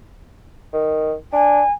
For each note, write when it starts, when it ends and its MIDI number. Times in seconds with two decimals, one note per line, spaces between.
0.73 1.14 51
1.33 1.61 62
1.33 1.72 80